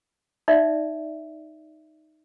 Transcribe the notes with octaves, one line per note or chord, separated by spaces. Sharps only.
D#4 D5 E5